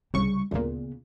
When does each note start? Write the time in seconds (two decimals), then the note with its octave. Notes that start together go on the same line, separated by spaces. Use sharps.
0.14 C2 C#3 G3 C#6
0.51 D2 A#2 C#3 B3